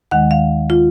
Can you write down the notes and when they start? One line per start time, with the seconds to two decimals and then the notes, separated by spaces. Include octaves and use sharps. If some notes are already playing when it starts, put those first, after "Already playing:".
0.11 D#2 D#3 G#3 F#5
0.31 F5
0.70 F4